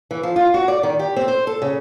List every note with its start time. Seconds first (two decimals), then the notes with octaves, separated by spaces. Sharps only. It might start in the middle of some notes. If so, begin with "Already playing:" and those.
0.11 E3
0.23 F3
0.36 F4
0.54 F#4
0.68 D5
0.83 D#3
0.99 G4
1.16 C4
1.28 C5
1.47 A4
1.62 C#3